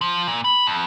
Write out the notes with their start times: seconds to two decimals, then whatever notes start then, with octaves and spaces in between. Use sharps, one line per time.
0.01 F3
0.28 A#2
0.45 B5
0.67 F2